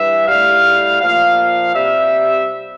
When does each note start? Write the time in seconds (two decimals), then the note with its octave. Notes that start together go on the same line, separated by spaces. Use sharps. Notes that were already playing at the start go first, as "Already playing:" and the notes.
Already playing: G2 E3 E5
0.28 A2 G3 F5
1.01 A#2 F3 F5
1.75 C3 G3 E5